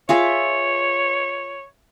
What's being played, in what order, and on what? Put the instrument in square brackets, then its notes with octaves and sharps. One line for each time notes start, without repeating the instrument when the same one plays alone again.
[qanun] F4 G#4 E5 [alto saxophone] C#5